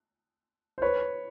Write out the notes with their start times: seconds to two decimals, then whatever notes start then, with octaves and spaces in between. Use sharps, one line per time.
0.78 C5
0.82 B4 C#5